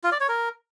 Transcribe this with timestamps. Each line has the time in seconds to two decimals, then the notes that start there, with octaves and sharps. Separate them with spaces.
0.04 F4
0.12 D5
0.20 C#5
0.29 A#4